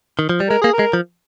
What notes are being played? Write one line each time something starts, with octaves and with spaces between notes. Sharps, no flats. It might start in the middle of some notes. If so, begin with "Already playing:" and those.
D#3
F3
G3
G#3 A#4
A#3 G#4
A#4
G#3
F3